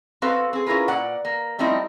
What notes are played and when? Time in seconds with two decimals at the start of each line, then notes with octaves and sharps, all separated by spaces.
0.22 B3 C4 F#4 A4 B4 F5
0.53 C4 G#4
0.66 C#4 E4 F4 G#4 A#4 B4
0.88 A#2 D5 F#5
1.25 A#3
1.58 F3 G3 A3 C4 D#4 E4